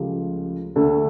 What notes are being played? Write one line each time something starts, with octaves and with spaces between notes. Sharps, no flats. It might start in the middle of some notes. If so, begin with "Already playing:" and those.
Already playing: C#2 C#3 F3 A3 G4
D2 D3 A3 A4